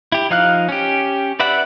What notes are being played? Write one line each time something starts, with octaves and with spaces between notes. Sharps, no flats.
E4 G4
F3 D#4 F5 F6 F#6
C#4 G4
B4 D5 E5 F#5 B5